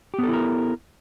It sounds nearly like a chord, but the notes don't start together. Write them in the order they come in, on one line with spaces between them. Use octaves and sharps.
G4 B3 A4 E4 A#4